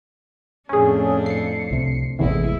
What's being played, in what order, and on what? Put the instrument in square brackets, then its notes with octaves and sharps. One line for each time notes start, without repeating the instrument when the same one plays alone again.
[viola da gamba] F2 A2 D4 [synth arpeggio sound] C#4 G#4
[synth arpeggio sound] C7 C#7
[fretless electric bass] C2 C3
[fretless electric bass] A1 A2 C3 [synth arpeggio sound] E2 E3 [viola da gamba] G#3 E4